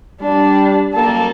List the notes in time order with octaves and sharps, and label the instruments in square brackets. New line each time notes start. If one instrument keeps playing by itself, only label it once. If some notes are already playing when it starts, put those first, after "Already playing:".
[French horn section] G3 [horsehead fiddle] D4
[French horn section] F#2 G3 A#3 [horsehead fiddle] A4 A5